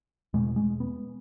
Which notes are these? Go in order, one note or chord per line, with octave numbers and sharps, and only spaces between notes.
E2 B2 G#3
G#3
B3